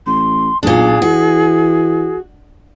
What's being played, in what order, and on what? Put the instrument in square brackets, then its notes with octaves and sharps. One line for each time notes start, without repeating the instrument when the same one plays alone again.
[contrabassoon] A1 [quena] C6
[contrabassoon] B1 [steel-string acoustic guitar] A#2 D4 [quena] G#4
[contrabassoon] E3 [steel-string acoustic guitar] F#4